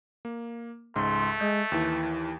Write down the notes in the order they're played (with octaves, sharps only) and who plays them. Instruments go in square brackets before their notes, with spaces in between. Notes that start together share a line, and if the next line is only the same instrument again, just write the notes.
[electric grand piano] A#3
[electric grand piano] C#2 G#2 G#3 [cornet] A3 [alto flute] C6
[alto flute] G#3 [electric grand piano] D#5 G6
[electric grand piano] D#2 E3 [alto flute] E4